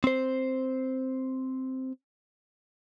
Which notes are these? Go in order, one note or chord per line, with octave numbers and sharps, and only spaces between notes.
C4 C5